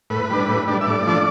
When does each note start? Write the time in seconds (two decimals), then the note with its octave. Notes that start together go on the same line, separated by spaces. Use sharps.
0.10 A2 B4
0.30 G3 D4
0.48 A2
0.67 G3 D4
0.81 E5
0.86 A2 D5
1.06 F3 A3 D4